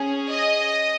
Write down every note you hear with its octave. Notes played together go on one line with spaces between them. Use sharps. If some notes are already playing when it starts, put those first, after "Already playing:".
Already playing: C#4 G#4
D#5